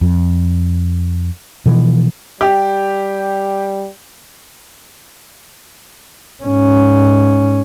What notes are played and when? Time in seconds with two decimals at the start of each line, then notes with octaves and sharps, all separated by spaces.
0.01 F2
1.66 B2 E3 F3
2.41 G3 G4
6.44 G#2 C#4